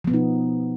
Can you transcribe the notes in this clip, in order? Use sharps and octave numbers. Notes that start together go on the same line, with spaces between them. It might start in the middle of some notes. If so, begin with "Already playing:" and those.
B2 F3 B3 D#4